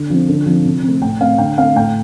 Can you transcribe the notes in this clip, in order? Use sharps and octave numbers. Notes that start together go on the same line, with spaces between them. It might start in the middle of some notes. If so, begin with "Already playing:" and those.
Already playing: D3
F3 C4
D3
F3 C4
C3
A3 C4
A2 G5
A3 C4 F5
D3 G5
A3 C4 F5
A2 G5